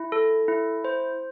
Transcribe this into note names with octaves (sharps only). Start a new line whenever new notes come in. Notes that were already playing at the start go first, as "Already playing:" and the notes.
Already playing: E4
A4
E4
C5